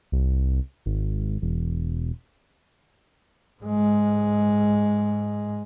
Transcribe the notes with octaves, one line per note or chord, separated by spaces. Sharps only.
C2
G#1
E1
G#2 G#3